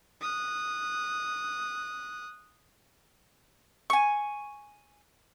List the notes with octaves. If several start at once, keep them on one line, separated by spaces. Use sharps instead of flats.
D#6 F#6
G#5 C#6